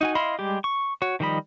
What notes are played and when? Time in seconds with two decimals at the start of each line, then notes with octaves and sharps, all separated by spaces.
0.01 D#4 F#4 G#5
0.15 E4 D#5 F5 B5 C6
0.39 G3 G#3 G4
0.64 C#6
1.02 F#4 C#5
1.20 D#3 F3 G3 D#5 B5